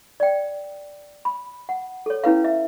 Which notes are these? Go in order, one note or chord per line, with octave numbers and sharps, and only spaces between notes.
D5 G5
B5
F#5
A4 C#5
C#4 E4 B4 F5
E5